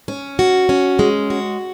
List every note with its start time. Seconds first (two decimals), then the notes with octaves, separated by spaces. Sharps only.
0.08 C#4
0.39 F#4
0.69 C#4
0.99 G#3
1.30 F#4